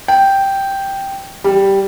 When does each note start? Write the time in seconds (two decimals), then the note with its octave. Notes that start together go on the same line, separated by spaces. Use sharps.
0.08 G5
1.44 G3